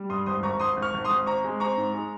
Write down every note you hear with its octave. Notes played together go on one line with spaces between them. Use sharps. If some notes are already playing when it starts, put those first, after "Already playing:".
Already playing: G3
G2 C6 D#6
G#1 C6 D#6
G#1 A#5 C#6
G#1 C6 D#6
G#1
C#6 F6
G#1
C6 D#6
G#1
C4 A#5 C#6
G#3
C4 A#5 C#6
G#2
G#3